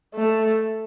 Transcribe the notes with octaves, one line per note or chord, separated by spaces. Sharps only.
A3